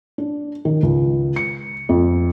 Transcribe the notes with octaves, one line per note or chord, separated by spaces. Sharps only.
D4
D#3
C#2
C#7
F2